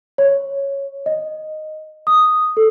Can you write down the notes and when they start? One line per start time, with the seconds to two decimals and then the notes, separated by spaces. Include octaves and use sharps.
0.18 C#5
1.06 D#5
2.07 D#6
2.57 A4